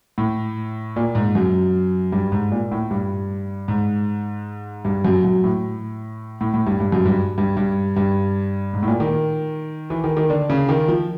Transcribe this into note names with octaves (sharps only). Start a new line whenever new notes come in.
A2
A#2
G#2
F#2
G2
G#2
A#2
A2
G2
G#2
G2
F#2
F#2
A2
A2
A2
G2
G2
F#2
G2
G2
G2
G2
G#2
A2
A#2
D#3
E3
D#3
D#3
D3
C#3
D#3
F3